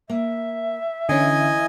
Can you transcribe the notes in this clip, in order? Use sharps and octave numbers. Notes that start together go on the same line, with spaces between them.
A#3 E5
D3 E3 C#4 D#5 G#5